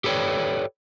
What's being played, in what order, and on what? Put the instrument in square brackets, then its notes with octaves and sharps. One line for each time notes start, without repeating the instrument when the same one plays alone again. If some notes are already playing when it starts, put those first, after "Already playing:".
[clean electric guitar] G4 A4 B4 C#5 D5 G5